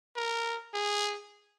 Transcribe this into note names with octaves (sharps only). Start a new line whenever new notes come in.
A#4
G#4